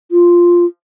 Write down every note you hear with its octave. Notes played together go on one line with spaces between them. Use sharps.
F4